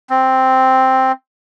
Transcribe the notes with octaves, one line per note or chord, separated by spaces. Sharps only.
C4